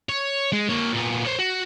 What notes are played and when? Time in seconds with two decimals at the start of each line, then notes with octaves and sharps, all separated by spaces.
0.09 C#5
0.52 G#3
0.69 A#3 C#5
0.93 A#2 B3
1.25 C5 C#5
1.39 F#4